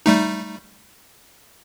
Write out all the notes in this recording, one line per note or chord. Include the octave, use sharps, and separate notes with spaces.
G3 A3 D#4